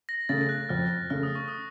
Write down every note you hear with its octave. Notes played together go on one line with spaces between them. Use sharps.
A#6
C#3 A3 A6
F#6
F2 F6
C#3 A3 F6
D#6
C#6
D#6